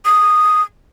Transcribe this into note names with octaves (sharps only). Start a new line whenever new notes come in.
D#6